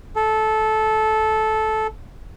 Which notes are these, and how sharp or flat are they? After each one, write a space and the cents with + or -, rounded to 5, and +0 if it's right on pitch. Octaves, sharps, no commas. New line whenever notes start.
A4 -15